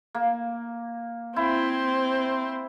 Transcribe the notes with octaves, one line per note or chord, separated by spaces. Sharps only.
A#3
C4 E4 C5